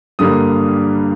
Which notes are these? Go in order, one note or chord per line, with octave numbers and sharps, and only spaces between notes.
G2 D3 G3 A#3 D#6